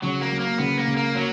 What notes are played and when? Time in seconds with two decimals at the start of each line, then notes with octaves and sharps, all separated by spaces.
0.03 C#3 F#3
0.22 A#3
0.32 F#3
0.40 A#3
0.59 C#3 B3
0.78 A#3
0.88 C#3
0.96 A#3
1.14 F#3 A#3